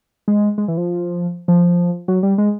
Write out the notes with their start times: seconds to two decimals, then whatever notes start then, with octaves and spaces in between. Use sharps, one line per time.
0.28 G#3
0.58 G#3
0.68 E3
0.77 F3
1.48 F3
2.08 F#3
2.23 G3
2.38 G#3